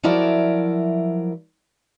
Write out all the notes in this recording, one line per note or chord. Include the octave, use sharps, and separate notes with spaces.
F3 F#3 E4 A#4 D5 E5